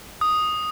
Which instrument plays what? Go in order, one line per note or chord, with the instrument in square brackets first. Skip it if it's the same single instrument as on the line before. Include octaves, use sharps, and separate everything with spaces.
[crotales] D#6